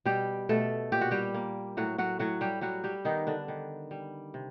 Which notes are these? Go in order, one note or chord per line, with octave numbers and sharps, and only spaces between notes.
B2 G3 G4
B2 A3 A4
A#2 G4
F#4
G3 G4
A#3
A2 F#3 F#4
F#3 F#4
A2 F#3 F#4
G3 G4
F#3 G3 F#4
G3 G4
D#3 B3 D#4
D3 D4
D#3
G3
C3